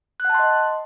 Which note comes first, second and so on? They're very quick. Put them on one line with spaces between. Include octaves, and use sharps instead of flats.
F#6 F#5 A5 C6 D#5